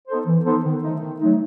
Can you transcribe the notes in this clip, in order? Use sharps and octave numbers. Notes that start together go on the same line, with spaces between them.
B3 D#4 A4 C5
E3
B3 D#4 A4 C5
D#3
F#3 A3 D#4
D#3
F#3 A3 D#4